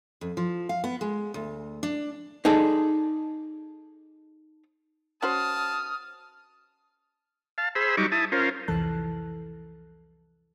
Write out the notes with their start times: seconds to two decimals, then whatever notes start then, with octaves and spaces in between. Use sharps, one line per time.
0.21 F2
0.37 F3
0.69 F5
0.84 B3
1.01 G#3
1.34 D2
1.83 D4
2.45 D#4 G#4 A4 D5
5.22 C#4 F#4 C5 A5 D#6 F6
7.58 F5 A5
7.75 G#4 C5 B5 E6
7.97 F#3 G3 D#4 C#6 D6
8.12 E4 A5 D#6
8.32 C#4 F4 A#4 C5
8.68 C2 F2 E3 A4 A5 F#6